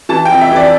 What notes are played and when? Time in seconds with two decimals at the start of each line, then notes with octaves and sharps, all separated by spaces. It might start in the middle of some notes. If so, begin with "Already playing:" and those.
0.09 E3 A5
0.25 G5
0.31 F2
0.41 E5
0.51 E3 D5